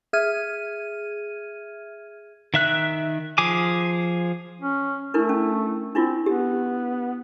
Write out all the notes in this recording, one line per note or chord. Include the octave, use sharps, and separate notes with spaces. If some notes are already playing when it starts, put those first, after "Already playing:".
G#4 E5 F6 G#6 D#7
D#3 E5 F#6
F3 G#4 G#5 D6
C#4
A3 D4 E4 A#4
C#4
C4 D4 E4 F4
B3 G4